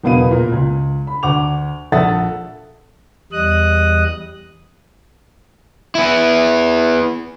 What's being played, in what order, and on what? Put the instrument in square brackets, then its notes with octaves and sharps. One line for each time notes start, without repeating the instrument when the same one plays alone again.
[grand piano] F#1 E2 B2 B3 F5 D#7
A#2 A#4
C#2
B5
D2 F#5 D6 F7
A#1 A4 E5 F#5 D#6 A6
[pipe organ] E2 G3 D#5 D#6 F#6
[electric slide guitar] B3 E4